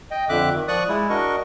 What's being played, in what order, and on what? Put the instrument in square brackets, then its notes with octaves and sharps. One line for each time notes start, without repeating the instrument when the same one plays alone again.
[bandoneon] D#5 G5
F2 D3 E5 D6 F#6
D#3
F3 D5 C#6 D#6 F#6
G#3 E4
D4 F#4 A#4 D#5 C#6